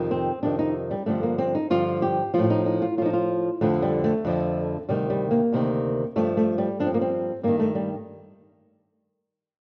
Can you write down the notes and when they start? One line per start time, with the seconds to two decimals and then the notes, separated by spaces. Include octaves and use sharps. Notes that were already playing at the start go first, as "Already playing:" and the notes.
Already playing: F2 C3 D#3
0.11 C4
0.43 F2 C3 D#3 D4
0.59 D#4
0.91 G3
1.06 G2 D3 F3 A3
1.23 A#3
1.38 C4
1.55 D#4
1.70 G2 D3 F3 F4
2.02 G4
2.34 F3 F4
2.38 A2
2.44 F4
2.50 D#4
2.66 D#4
2.82 F4
2.97 A2 F4
3.02 F3 D#4
3.13 F4
3.61 F2 D3 F3 A3
3.82 G3
4.04 A3
4.25 F2 D3 F3
4.89 D2 C3 D#3 G3
5.10 G3
5.31 A#3
5.53 D2 C3 D#3
6.16 G2 F3 A3
6.37 A3
6.58 G3
6.80 G2 F3 D4
6.87 C4
6.94 A#3
7.01 C4
7.43 G2 D#3 A#3
7.59 A3
7.75 G3